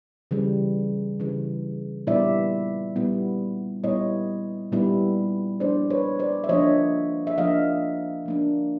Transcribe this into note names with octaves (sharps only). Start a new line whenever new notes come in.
C#3 E3 G3
C#3 E3 G3
A#2 G3 B3 E4 D5 E5
A#2 G3 B3 E4
A#2 G3 B3 E4 C#5 D#5
A#2 G3 B3 E4
F3 A#3 D4 C5 D5
B4 C#5
C5 D5
E5
F3 A#3 D4 C#5 D#5
E5
F3 A#3 D4 D#5 F5
F3 A#3 D4